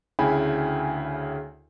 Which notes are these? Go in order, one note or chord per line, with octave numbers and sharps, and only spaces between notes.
D2 C#3 E4 G5 G#5 B5